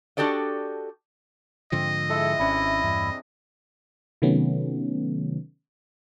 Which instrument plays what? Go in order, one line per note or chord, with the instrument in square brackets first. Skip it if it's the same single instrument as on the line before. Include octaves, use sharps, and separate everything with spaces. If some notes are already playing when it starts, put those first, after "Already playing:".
[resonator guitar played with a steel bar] D4 F#4 G4 A4 D5 D#5
[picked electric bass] G#2 D3 F3 [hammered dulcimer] C4 [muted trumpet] D#5
[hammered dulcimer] G#3 E4 G#4 [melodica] A4
[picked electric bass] G#1 C#4 [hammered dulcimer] C3 E3 D4 [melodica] E4
[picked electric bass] E2 G2
[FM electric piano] C3 D#3 F#3 A3 B3 C#4